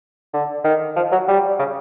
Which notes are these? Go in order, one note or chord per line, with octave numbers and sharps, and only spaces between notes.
D3
D#3
F3
F#3
G3
C#3